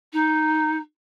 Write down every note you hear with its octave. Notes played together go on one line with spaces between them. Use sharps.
D#4